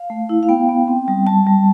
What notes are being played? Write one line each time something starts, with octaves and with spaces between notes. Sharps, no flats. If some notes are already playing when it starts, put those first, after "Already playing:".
Already playing: F5
A3
E4
F5
B3 G5
B3
C4
G3
G3 A5
G3